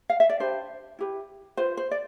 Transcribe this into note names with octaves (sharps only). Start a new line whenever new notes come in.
F5
E5
D5
D4 G4 B4 C5
E4 G4 B4
F4 B4 C5
C5
D5